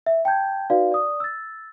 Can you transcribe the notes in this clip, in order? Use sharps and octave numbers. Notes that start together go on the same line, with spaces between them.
E5
G5 A5 G6 G#6
D#4 F#4 B4 D5 F5
D5 D#6
E6 A6